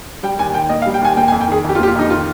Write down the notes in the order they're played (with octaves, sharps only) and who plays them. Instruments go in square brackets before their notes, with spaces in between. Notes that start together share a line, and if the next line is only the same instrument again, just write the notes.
[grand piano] G3 G5
D#2 G#5
D#3 G5
A#3 D#5
F5
G3
G5
D#2 G#5
A#3 G5
G#5
F2
G5
D#3 G#4
F2 G4
F4
A#3 G4
F4
F2 D#4
D#3 F4